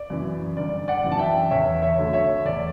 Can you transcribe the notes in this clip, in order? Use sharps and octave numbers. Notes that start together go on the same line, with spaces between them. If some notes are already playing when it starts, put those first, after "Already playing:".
Already playing: D5
F#2 E3
G1 D5
D5 F#5
F#2 E3
A5
E5 G5
E2 C#5 E5
C#5 E5
D3 F#3 A3
C#5 E5
E2 D5